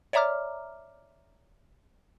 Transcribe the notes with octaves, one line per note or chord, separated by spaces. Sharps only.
C#5 D5 E5 A#5 D6 F6